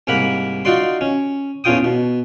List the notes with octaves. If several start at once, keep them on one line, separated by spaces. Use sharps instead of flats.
C2 G#2 A#3 A#4 F#5 B5
D#4 F4 F#4 D5 C6
C#4
E2 A2 C#4 F4 G5 D#6
B2